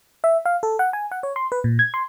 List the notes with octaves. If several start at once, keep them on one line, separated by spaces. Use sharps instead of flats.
E5
F5
A4
F#5
G#5
F#5
C#5
C6
B4
A#2
G#6
C6